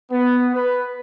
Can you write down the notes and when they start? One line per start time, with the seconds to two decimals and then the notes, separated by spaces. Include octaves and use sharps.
0.11 B3
0.54 B4